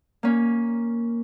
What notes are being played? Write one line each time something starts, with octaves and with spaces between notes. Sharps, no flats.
A#3 C#4